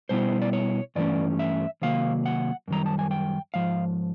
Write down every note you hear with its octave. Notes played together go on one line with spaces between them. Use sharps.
B2 G3 B3 E4 C5
D5
C#5
G2 E3 A3 C#4 D5
E5
C3 D#3 F#3 A#3 F5
F#5
F#2 D#3 G3 A#5
A5
G#5
G5
G#2 F3 F5